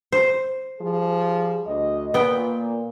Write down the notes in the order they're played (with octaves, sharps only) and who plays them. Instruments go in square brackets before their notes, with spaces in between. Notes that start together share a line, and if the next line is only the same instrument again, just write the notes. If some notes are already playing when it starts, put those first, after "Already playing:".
[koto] C5
[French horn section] F3 G3 G#4
D2 D#5
[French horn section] A#2 [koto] B3 G5